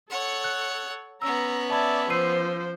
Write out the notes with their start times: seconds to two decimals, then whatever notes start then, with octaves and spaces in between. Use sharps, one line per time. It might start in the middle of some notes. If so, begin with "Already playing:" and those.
0.10 A4 C#5 F#5
0.44 F#6
1.22 B3 C#4 A#5 E6
1.70 D5 E5 A5 B5 G#6
2.10 F3 C5 E6 C7 D#7